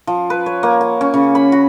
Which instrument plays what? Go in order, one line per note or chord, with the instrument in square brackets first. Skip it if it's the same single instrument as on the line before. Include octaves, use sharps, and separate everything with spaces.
[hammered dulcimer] F3
B4
C#5
A#3
F#5
C#4
C#3
B5
F#4